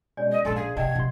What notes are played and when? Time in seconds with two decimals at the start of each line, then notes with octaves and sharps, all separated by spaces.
0.17 B2 G#3 C#4 C#5 D5 G#5
0.32 D5 D#5
0.45 A#1 A4 G#5 A5 C6
0.56 G#4 F5
0.77 C3 D#5 F#5 G5 A5 G#6
0.95 A#1 C3 C6